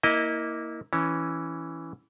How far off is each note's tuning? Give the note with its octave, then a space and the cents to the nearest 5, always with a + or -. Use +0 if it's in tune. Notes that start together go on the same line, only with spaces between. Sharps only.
A#3 +0 E4 -20 D#5 +0
E3 +0 C#4 +0 A5 +40